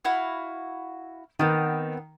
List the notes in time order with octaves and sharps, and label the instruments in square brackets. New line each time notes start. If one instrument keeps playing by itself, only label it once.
[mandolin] E4 F#4 F5
[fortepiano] D#3 [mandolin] B3 C4